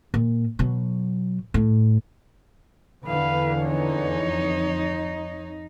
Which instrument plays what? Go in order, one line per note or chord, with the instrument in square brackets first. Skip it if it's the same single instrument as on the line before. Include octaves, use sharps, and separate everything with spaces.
[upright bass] A#2
B2 F#3
A2
[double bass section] E2 D3 E3 [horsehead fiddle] B4 F5
[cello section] F2 D#4 [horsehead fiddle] C#5